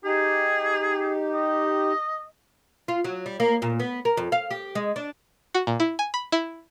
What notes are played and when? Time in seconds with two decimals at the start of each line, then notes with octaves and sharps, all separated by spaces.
0.05 D#4 G4 G#4
1.34 D#5
2.88 F4
3.05 F#3
3.26 G3
3.40 A#3
3.62 A#2
3.80 B3
4.05 A#4
4.17 F2
4.32 F5
4.51 G4
4.75 G#3
4.96 D4
5.55 F#4
5.67 A#2
5.80 E4
5.99 G#5
6.14 B5
6.32 E4